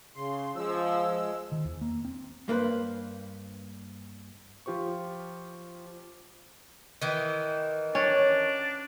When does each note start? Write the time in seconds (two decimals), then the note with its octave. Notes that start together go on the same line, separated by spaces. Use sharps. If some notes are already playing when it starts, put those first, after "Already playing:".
0.16 C#3 C6
0.56 F3 G#3 E6
1.52 D#3
1.65 E2
1.81 A#3
2.05 C4
2.48 G2 A#3 D4 B4 C5
4.66 F3 F4 G4 C5 C#6
7.01 D#3 E3
7.95 C#4 D4